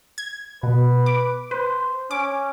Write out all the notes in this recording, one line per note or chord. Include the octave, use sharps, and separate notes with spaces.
G#6
B2 B4
D6
B4 C5
C#4 D6